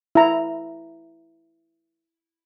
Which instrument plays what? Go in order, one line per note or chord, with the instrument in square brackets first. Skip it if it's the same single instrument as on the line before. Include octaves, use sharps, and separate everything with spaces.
[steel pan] E4 A#5